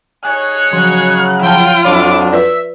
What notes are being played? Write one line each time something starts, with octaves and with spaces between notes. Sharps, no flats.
D#4 G#4 C#5 G#5 F#6
C#3 F3 F#3
F3 F4 G5 A5
F2 F#3 D4 C#5 B5 D6
F4 B4 D5 E5